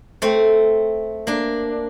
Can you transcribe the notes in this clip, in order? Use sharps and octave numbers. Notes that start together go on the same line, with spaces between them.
A3 C4
A#3 D4